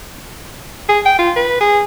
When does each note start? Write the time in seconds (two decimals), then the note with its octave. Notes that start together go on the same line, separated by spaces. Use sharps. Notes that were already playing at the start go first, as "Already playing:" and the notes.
0.89 G#4
1.06 G5
1.19 F4
1.36 B4
1.61 G#4